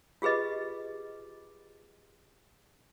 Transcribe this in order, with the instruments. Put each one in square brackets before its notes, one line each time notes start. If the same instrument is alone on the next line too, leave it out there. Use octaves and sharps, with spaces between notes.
[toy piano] F4 G4 G#4 B4 D#5